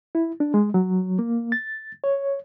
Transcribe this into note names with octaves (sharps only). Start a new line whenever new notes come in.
E4
D4
G#3
F#3
A#3
A6
C#5